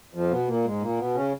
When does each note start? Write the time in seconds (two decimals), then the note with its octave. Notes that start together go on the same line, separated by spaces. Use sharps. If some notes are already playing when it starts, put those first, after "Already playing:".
0.14 F2 F3
0.31 B2 B3
0.48 A#2 A#3
0.65 G#2 G#3
0.82 A#2 A#3
0.98 B2 B3
1.15 C#3 C#4